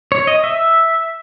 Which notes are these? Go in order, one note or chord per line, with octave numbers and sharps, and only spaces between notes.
C#5
D#5
E5